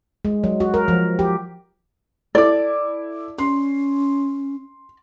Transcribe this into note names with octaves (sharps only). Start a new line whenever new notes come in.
G#3
F#3
F#4
A#4
F3
G4
E4 A4 D5 D6
C#4 C6